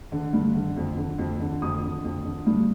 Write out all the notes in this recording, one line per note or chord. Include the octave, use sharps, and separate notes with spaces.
D3
G2
D3
F2
D3
F2
D3
F2 D#6
D3
F2
D3
G2